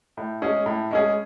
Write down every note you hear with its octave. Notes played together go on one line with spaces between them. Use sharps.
A2
G#3 C#4 G#4
A2
G#3 C#4 G#4